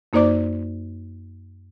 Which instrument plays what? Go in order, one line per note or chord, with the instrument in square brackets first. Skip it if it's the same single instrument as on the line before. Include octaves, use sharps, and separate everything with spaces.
[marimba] F#2 A#3 D#4 C5 D5 D6